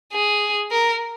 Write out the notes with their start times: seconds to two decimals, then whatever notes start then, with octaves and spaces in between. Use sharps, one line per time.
0.13 G#4
0.71 A#4